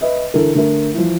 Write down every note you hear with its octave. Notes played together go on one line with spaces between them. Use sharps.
B4 D#5 E5
D3 E3 A4 A#4
D3 A3 A#4
E3 F3